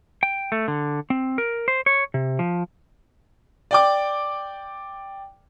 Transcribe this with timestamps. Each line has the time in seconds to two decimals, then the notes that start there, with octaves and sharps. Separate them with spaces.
0.23 G5
0.52 A3
0.68 D3
1.10 C4
1.38 A#4
1.68 C5
1.86 C#5
2.14 C3
2.39 F3
3.71 D5 G5 D6